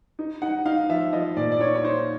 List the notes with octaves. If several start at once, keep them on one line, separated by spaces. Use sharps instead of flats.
D#4
D#4 F#5
D#4 F5
F3 E5
F3 D#5
A#2 D5
D5
D#4 C#5
C#5
D#4 C5